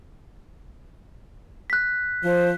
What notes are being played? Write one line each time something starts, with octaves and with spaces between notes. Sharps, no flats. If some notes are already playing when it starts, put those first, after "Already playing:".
F#6 B6
F3 C5